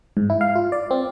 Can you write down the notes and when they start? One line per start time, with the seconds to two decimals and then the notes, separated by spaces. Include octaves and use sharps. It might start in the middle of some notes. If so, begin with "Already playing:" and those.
0.17 G#2
0.30 E4
0.41 F5
0.55 F4
0.72 D5
0.91 C4